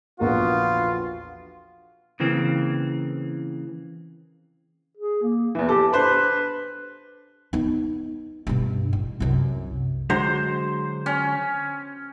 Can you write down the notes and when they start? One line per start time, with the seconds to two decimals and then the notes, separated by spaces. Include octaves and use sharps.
0.20 A#1 E2 D3 B3 F4 F#4 A#4
2.20 C#3 E3 A#3 C4
4.97 G#4
5.22 A#3
5.55 E2 E3
5.69 G4 A4
5.93 D4 B4 C5 B5
7.53 B3 D#4
8.47 G2 B2
8.93 A1
9.20 C2 F#2
10.10 D3 F#3 G#3 C5
11.06 C#4